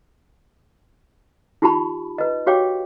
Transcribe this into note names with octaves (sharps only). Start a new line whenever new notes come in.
D#4 F4 G4 A5 B5 C#6
B4 D#5
F#4 G4 C#5 F5 G5 D6